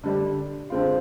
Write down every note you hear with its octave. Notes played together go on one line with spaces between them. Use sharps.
D3 G3 D4
D3 G#3 C4 F4